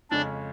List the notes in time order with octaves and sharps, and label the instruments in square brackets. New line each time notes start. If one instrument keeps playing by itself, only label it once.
[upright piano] F2 C#3 G#3 C#4 [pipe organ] D4 D5